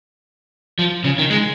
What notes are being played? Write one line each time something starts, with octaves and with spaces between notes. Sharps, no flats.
F3
C#3
D#3
G#3